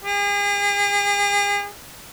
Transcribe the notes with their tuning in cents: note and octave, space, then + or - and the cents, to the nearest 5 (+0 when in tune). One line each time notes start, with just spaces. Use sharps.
G#4 -40